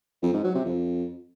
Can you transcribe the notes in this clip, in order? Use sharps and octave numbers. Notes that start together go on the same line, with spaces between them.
F2
G#2
F#3
C3
F2